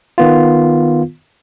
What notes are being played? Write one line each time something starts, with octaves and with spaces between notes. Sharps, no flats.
D#3 B3 F4